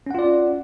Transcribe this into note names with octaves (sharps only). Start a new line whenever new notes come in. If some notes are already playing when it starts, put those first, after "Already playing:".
C#4 F4 D5 F#5